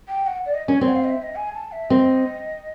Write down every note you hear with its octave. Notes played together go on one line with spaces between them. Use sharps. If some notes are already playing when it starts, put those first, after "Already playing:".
G5
F#5
D5
D#5
C#4 C#5
C4 C#5
F#5
F5
D#5
E5
D#5
G#5
A5
E5
C4 D#5